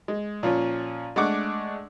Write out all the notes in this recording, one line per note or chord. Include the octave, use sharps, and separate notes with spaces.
G#3
A#2 F3 C#4
G#3 A3 D4 F#5 C#6 D6